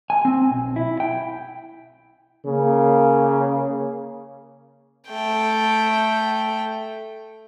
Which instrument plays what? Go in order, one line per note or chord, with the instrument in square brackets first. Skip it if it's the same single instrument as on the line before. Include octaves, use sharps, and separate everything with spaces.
[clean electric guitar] G#5
C4
B1
E4
G5
[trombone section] C#3 A#3
[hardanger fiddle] A3 G5